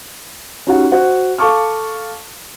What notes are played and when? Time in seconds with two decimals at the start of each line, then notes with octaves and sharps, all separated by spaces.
0.67 C#4 D#4 F#4 G4 F#5
0.92 F#4 C5 F#5
1.38 A4 F5 A5 C#6 D6 F6